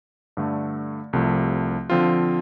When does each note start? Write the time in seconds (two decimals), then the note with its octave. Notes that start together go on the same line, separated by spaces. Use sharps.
0.37 G2 D3 A3
1.13 C2 C3 F3 A3
1.90 D3 F3 C4 F4